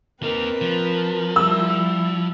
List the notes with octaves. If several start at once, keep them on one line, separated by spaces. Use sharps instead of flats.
A#3 C4 D#4 A#4 B4
F3
G3 E4 E6